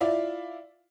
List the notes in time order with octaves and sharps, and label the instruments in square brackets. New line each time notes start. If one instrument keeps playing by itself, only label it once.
[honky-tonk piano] E4 F4 D5 E5 F5